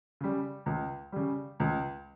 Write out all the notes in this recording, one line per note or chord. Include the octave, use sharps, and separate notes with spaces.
C#3 G3
C#2
C#3 G3
C#2